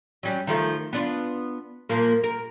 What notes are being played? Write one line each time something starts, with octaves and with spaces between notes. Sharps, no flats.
F#3 G3 C#4
D#3 F3 A3
B3 D4 F4
A#2 F3 A#3
A#4